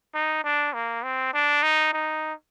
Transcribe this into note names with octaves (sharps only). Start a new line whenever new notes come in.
D#4
D4
A#3
C4
D4
D#4
D#4